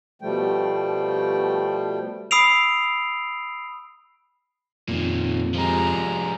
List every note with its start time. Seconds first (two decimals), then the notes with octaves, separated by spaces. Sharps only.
0.22 B2 F3 G3 A3 G5
2.31 B5 D#6 E6 C7 D7 F7
4.88 F2 A#2 D#3
5.54 F3 G3 G#3 A#5